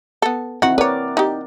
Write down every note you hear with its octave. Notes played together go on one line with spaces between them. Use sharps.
B3 A4
D#3 C4 E4 F#4 F#5
A#4 B4 C#5 D5
D#4 G4